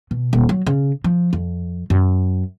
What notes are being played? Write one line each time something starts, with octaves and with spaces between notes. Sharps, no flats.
B2
D#1
F#3
C#3
F3
F2
F#2